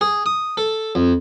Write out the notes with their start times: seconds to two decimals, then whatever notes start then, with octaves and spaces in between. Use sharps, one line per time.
0.01 G#4
0.26 D#6
0.57 A4
0.95 F2